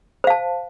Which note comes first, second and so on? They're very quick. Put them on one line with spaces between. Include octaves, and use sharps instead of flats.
C5 F5 A5